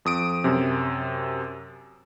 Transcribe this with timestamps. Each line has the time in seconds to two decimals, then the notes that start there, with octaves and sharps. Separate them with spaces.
0.05 F2 D#6 D7
0.44 F#2 C3